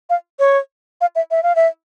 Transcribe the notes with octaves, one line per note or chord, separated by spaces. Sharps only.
F5
C#5
F5
E5
E5
F5
E5